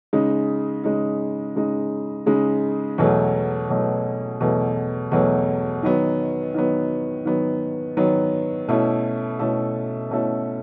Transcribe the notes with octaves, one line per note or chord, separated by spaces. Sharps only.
C#3 G#3 D#4
C#3 G#3 D#4
C#3 G#3 D#4
C#3 G#3 D#4
E2 B2 F#3 A3
E2 B2 F#3 A3
E2 B2 F#3 A3
E2 B2 F#3 A3
D#3 F#3 B3
D#3 F#3 B3
D#3 F#3 B3
D#3 F#3 B3
B2 A3 C#4 E4 A4
B2 A3 C#4 E4 A4
B2 A3 C#4 E4 A4